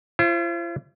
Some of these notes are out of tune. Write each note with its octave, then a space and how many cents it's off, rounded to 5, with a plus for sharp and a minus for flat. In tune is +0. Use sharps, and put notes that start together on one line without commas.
F4 -45 C5 +25